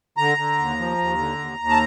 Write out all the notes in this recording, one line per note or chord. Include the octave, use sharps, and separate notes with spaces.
D3 A#5
D3
D#2
F3
D#2
D3
D#2
D#2
A5